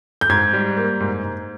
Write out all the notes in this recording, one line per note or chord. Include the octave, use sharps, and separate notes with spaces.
G6
G#2 G#6
G3
A#3
G#2
G#2